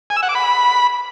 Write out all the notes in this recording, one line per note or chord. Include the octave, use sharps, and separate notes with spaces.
G#5
E6
F#5
D6
B5